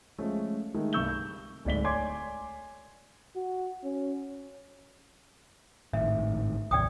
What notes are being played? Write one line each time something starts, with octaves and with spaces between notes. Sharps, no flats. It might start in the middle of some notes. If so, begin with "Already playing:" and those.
F3 G#3 A3 C#4
D#3 G#3 A3
C2 G2 C#6 E6 G6 G7
G6
D1 G#2 D5 B6 G7
C#5 D5 G#5 C6 D6 G#6
F#4
C#4
G#1 A2 D#3 E5
A1 D#2 D5 G5 D#6